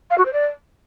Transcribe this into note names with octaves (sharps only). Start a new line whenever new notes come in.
F5
F#4
C5
D5